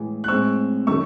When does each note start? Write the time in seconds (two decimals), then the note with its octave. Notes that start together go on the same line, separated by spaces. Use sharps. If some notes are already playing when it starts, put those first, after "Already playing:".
Already playing: A2 E3 G#3
0.24 F#6
0.28 A2 G#3 C4 C#6 E6
0.87 D#3 F#3 A3 C#6 E6